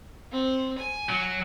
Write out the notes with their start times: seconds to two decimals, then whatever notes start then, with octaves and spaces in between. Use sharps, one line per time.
0.32 C4
0.78 G#5
1.09 F#3